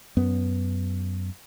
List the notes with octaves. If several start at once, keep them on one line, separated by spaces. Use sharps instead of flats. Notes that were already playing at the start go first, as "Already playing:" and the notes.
F#2 B3